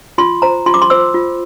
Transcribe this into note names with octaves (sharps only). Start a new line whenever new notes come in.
F4 C6
C5 A#5
F4 C6
D6
C6
C5 E6
F4